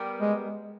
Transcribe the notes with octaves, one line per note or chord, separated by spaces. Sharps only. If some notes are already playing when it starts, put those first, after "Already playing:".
Already playing: G3 B3 A#4
G#3